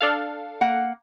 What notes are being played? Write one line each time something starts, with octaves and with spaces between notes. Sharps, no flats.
D4 A4 F5
A#3 F#5